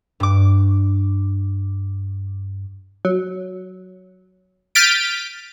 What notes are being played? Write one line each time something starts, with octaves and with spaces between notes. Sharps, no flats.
G2 D6
F#3
F6 G6 A6 B6 D7 D#7